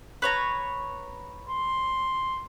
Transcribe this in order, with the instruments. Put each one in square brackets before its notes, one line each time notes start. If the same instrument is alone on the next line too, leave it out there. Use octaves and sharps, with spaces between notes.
[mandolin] B4 C#5 A#5
[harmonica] C6